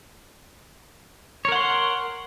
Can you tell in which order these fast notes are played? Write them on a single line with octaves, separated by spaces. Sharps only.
C#5 A#4 F#5 C6